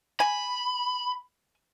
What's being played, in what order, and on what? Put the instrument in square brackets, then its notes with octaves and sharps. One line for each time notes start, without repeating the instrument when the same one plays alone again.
[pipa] G#5 [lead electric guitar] B5